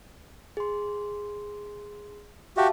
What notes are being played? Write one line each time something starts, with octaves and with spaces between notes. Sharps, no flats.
G#4 C6
F#4 G4 E5 F5 A5